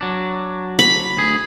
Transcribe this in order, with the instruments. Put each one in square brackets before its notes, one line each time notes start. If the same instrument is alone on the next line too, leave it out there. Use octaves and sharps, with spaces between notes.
[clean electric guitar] F#3 D4
[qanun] B5
[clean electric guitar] D2 G#4